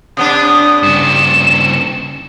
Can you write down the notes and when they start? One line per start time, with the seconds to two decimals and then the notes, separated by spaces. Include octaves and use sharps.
0.17 C3 B3 D4 D#6
0.43 D#6
0.83 G2 C#3 E7